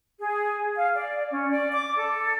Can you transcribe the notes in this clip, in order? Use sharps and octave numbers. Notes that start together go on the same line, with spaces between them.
G#4
F5
D5
C#4
D5
D6
A4